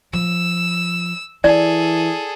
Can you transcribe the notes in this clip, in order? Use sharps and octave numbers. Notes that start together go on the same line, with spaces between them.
F3 E6
E3 E4 G#4 A4 D5